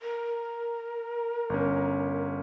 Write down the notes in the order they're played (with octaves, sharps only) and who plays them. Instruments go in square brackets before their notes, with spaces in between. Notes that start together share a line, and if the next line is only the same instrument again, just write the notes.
[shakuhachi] A#4
[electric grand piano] G1 C#4